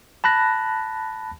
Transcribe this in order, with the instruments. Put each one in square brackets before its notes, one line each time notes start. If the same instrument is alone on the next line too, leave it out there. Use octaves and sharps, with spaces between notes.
[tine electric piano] A5 B5 F#6 A#6